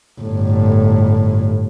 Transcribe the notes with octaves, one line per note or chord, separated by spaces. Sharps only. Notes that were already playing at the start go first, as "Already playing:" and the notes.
G1 A2